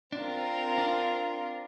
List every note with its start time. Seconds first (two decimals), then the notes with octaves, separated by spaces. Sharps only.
0.12 C4 D4 F4 A#4
0.78 D4